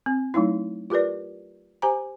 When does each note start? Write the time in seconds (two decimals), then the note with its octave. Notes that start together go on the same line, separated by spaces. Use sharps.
0.06 C4
0.34 F#3 A3 D#4 E4
0.90 F4 G4 A#4 B4 D5
1.82 G4 C5 G#5 A#5